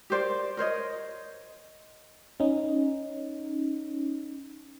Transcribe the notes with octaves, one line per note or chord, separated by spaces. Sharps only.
G4 A#4 C5 D5
A#4 C5 C#5 D#5
C#4 D#4